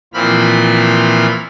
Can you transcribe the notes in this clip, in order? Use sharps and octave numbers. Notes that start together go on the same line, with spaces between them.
A#2 E3 F3 C4 B5 F6